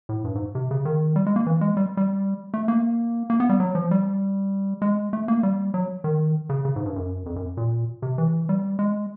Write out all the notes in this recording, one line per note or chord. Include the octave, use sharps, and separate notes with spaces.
A2
G2
G#2
C3
C#3
D#3
G3
G#3
A#3
E3
G#3
G3
G3
A3
A#3
A#3
B3
G3
F#3
F3
G3
G#3
A3
A#3
G3
F#3
D#3
C#3
C#3
G#2
G2
F#2
F2
F#2
A#2
C3
E3
G3
G#3